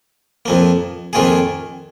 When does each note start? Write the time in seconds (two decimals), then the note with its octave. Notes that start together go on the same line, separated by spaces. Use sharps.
0.46 F2 F3 A#3
1.13 F2 D#3 A#3 F4 G#4